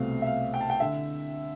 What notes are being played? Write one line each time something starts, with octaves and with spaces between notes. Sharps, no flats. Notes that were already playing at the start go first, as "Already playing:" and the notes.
Already playing: C2 B2 A3 C4 F5
E5
F5
G5
A5
G5
D3 E5